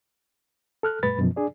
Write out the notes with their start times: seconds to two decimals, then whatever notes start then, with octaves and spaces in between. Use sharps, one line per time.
0.83 A4 F6 F#6
1.03 F#2 A#2 G#3 B4 B5 A6
1.19 F#2 B2 F3
1.36 D4 G#4 D5